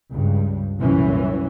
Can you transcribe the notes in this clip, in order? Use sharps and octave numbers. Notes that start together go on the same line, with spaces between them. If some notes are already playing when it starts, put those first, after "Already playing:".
C#2 G2
C2 F#2 A#2 E3 C#4